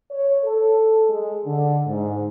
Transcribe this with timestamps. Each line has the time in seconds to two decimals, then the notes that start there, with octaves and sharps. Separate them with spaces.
0.11 C#5
0.44 A4
1.09 G#3
1.45 D3
1.86 G#2